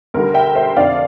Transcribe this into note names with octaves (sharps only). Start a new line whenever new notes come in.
D2 D3 G3 A#4
E5 G5
C5 E5
F1 F2 D3 D5 F5